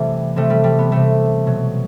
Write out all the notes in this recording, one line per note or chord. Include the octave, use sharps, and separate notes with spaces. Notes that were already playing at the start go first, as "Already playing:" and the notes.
Already playing: C3 E3 G3 A3
C3 G3 A3
G3
G3
B3
C3 G3 A3
B2 F#3